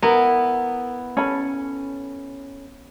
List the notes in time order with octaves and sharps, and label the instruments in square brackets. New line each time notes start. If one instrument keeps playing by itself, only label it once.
[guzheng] B3 E4 [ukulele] A#4
[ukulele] C#4 A4 B5